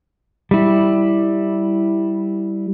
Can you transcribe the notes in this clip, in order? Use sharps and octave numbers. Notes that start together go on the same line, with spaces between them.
G3 E4